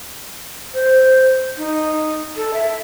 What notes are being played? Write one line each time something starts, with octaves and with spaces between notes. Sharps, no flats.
C5
D#4
A4
E5